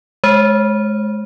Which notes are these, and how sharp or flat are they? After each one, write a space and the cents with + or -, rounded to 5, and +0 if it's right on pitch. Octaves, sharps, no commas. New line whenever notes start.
G#3 +25 C5 +30